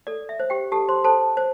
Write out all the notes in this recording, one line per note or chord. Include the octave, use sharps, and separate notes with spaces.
A4 D5
E5
C5
G4 G5
G4 A4 A5
C5 C6
A4 C5 A5
C5